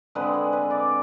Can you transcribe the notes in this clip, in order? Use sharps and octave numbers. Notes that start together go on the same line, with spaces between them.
D3 G#3 C4 B4
G#4
B4
D5